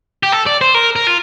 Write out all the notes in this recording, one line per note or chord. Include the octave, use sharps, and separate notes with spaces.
G4
A4
D5
C5
A#4
A#4
F4